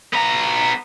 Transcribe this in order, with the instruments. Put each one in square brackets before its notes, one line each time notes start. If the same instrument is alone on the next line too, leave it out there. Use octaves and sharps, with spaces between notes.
[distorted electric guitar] B3 A#5